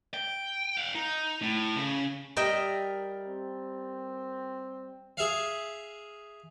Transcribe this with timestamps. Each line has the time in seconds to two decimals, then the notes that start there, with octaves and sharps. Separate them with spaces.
0.14 G5
0.77 F5 F#5
0.95 D#4
1.42 A2
1.76 C#3
2.37 G3 A#4 D#5 E5 G5
3.28 C4
5.17 G#4 E5 F5